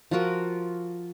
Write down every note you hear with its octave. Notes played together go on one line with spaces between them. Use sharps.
F3 F4 F#4 A#4